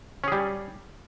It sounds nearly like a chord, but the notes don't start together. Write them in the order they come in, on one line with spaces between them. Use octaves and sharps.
C#4 G#4 G3